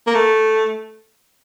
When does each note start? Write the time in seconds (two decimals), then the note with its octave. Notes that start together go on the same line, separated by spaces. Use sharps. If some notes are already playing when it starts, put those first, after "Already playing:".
0.07 A#3
0.14 A3